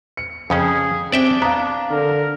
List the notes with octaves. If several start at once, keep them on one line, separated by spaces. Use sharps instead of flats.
C#7
F2 C#3 C#4 G#4 G5
C4 D4 D5 E5 G5
B3 F5 A#5
D3 A#4